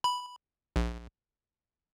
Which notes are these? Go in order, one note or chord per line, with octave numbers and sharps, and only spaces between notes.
B5
A#1